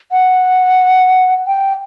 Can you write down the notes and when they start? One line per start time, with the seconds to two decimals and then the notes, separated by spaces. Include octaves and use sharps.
0.12 F#5
1.47 G5